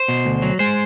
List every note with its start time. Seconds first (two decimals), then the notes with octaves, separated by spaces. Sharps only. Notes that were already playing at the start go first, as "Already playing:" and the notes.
Already playing: C5
0.08 B2
0.25 D2
0.42 F#3
0.59 G#3 C5